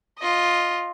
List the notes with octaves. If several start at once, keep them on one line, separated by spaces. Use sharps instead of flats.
F4 D#5